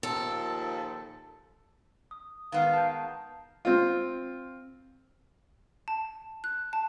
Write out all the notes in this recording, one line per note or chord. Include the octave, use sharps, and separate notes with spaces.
D#2 A#2 F3 A4
D#6
D#3 G#3 B3 F5
A5 G6
C4 F4
A5
F#6
A5